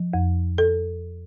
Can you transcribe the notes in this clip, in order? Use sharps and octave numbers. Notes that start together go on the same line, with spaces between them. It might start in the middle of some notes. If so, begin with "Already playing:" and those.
Already playing: F3
F2
A4